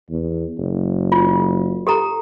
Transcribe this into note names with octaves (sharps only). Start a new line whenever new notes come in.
E2
F#1
F4
G4 A4 A#5